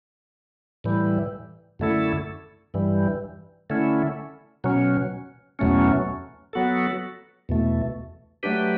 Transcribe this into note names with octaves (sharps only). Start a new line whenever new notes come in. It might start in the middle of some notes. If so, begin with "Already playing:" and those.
A2 E3 G3
F#2 D3 A3 E4 A4
G2 E3 G3
D3 A3 C#4 E4
B2 F#3 C#4
E2 B2 F#3 A3 C#4
F#3 B3 F#4 A4
E2 B2 A3
F#3 A3 D4 G4 B4